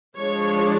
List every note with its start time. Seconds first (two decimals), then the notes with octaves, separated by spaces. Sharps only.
0.17 F3 G#3 D4 C#5